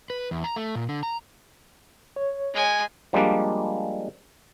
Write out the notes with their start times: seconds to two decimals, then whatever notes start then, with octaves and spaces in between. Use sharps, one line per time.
0.10 B4
0.31 E2
0.44 A#5
0.56 A3
0.75 A#2
0.89 D3
1.03 A#5
2.16 C#5
2.54 G#3 G#5
3.13 F3 G3 G#3 A#3 D4